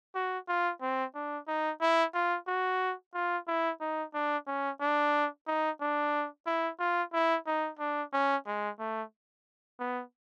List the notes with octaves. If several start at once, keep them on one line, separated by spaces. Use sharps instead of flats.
F#4
F4
C4
D4
D#4
E4
F4
F#4
F4
E4
D#4
D4
C#4
D4
D#4
D4
E4
F4
E4
D#4
D4
C#4
G#3
A3
B3